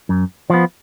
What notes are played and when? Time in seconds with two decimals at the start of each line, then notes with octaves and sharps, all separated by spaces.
0.09 F#2
0.50 F3 B3